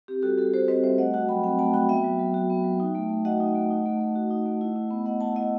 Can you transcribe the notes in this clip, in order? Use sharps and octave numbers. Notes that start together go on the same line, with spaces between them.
C4 G4
G3 F#4 A4
G3 F#4 A4
F#4 A4 C5
C4 B4 D#5
G3 C5 E5
A3 D#5 F#5
F#4 F#5 A5
F#3 G5 B5
C4 G5 B5
A3 F#5 A5
F#4 G5 B5
B3 E5 G5
F#3
F#3
F#4
B3
F#3
D#4
A3
A3
F#4 D#5 F#5
D#4
A3
D#4
A3
A3
F#4
D#4
A3
E4
E4
B3
B3 D#5 F#5
E4 F#5 A5
E4 D#5 F#5